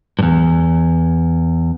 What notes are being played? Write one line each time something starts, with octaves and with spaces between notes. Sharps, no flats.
E2 G2